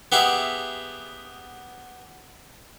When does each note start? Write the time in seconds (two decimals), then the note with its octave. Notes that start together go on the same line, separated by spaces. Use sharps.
0.12 B3 G4 G#4 E5